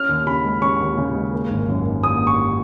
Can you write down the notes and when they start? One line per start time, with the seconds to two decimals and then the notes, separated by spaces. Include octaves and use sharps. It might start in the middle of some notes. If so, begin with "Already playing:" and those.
Already playing: C#4 F6
0.09 D#2
0.27 C#3 B5
0.44 G#3
0.62 C#4 C#6
0.80 D#2
0.97 C#3
1.15 G#3
1.33 A#3
1.50 G#1
1.68 F#2
1.86 D#3
2.03 A#3 D#6
2.22 G#1
2.27 C#6